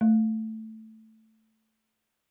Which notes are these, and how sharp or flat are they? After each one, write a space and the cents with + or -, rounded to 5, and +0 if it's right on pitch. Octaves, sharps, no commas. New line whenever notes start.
A3 +5